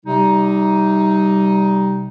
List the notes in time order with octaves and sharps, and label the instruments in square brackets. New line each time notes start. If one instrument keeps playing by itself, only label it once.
[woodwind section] C3 G3 D#4